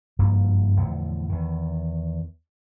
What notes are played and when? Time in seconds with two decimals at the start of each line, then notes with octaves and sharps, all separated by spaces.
0.19 F#1 G2 F3 A#3
0.77 E2 A2 D3 F3
1.29 E2 D#3